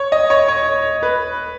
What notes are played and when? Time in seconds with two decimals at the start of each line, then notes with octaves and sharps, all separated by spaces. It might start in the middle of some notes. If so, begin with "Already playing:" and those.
Already playing: C#5
0.12 D#5
0.30 C#5
0.48 C#5
1.03 B4